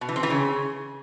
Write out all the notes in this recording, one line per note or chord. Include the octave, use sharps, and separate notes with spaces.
B2
E3
C4
E3
C#3